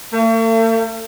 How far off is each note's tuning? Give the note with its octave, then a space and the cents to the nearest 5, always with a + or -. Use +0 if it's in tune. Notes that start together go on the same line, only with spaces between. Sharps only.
A3 +45